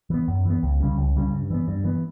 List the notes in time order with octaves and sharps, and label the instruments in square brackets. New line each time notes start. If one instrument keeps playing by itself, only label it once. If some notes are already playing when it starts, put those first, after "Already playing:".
[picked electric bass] E3 B3
F#2
E3 B3
C#2
C#3 G3 C#4
C#2
C#3 G3 C#4
G2
E3 B3
G2
E3 B3